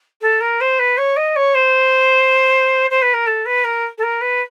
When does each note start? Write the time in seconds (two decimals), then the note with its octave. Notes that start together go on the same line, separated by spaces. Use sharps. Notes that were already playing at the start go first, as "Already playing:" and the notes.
0.21 A4
0.41 A#4
0.61 C5
0.79 B4
0.97 C#5
1.16 D#5
1.36 C#5
1.55 C5
2.90 C5
3.02 B4
3.14 A#4
3.27 A4
3.46 B4
3.64 A#4
3.98 A4
4.03 A#4
4.21 B4